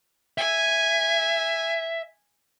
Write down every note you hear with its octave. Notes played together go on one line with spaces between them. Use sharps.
E5 G#5